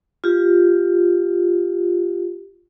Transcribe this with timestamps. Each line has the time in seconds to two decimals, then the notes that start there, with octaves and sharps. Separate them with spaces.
0.24 F4 G4